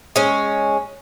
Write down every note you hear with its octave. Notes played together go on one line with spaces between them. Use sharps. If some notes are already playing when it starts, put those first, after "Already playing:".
G#3 C#4